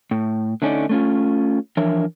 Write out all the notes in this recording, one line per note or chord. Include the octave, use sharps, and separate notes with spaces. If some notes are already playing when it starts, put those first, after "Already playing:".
A2
D3 A3 C#4 D#4 D5
A3 C#4 F4
E3 F3 D4 A#4 C#5 E5